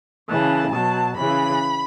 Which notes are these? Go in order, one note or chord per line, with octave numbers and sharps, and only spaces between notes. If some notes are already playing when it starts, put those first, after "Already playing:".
C#3 E3 A5
B2 F#3 A5
C#3 E3 B5